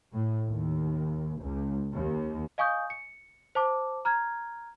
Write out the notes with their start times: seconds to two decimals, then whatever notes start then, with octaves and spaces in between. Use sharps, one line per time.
0.13 A2
0.47 D#2
1.41 C#2
1.93 D#2
2.58 D#5 F5 G#5 C#6 D#6 G6
2.90 C#7
3.55 C5 A5 D6
4.05 A#5 F6 G#6